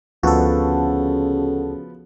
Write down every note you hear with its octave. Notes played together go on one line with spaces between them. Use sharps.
D2 C#3 F3 B3 F#4 A4